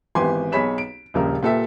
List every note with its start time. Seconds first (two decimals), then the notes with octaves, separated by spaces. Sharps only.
0.15 G#1 E3 B3 G4 G#5 C6
0.52 B1 G#4 C#5 B5 B6 E7
0.78 D7
1.14 D#1 A#1 C#3 A#4
1.43 A#2 G4 A4 B4 E5